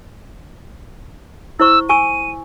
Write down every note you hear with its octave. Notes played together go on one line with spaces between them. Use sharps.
E4 C5 C#6 E6
G#5 C#6 E6 D#7